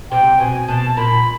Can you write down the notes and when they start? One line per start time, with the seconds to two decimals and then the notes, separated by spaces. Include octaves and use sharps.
0.10 C3 G5
0.39 B2 G#5
0.68 B2 A5
0.97 A#2 B5